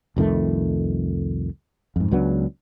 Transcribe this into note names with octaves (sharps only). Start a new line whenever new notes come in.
C2 F2 D#3 A3
F2 G#2
C#2 F#3 B3 D4